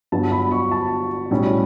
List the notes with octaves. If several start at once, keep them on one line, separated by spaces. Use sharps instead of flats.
G1 G2 D3 F#3 B3 A5
B5
C#6
A5
B1 A2 G3 C#4